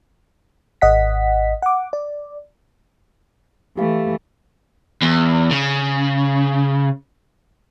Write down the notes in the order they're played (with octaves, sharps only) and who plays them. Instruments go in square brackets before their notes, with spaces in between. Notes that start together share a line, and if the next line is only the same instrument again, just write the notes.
[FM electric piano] G#1 D#5 F#5 B6
F#5 D6
D5
[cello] E3 A3 [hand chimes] G4 F5
[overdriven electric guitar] E2
C#3